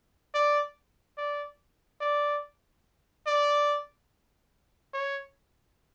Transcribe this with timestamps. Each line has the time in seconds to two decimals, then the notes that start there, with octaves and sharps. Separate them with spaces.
0.34 D5
1.18 D5
2.01 D5
3.27 D5
4.94 C#5